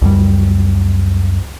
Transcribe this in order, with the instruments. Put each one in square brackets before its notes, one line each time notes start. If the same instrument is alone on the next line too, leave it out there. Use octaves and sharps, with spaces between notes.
[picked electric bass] C#2 F#2 G3